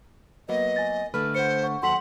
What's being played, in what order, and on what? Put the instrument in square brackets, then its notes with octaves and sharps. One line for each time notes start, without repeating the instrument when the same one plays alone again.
[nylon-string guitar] F#3 A#3 B3 [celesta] B4 [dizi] D#5
[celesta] G#5 A6
[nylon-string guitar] D3 A3 B4 [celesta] F6
[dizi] C5 [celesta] F#5 C#7
[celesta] F#5 C#6
[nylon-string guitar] D#2 F#3 A4 [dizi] F#5 [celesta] C6 B6 F#7